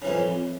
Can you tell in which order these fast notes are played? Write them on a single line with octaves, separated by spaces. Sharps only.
C#3 E3 F2